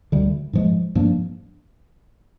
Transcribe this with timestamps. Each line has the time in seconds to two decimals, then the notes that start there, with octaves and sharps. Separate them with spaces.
0.12 D2 D3 G3
0.53 G#2 F3 G#3
0.95 G2 F3 A#3 D4